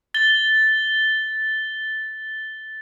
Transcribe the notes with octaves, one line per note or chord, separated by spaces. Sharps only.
A6 G7